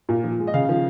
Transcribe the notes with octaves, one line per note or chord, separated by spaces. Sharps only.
A#2
F3
G#3
D#5
C#3 F5
F3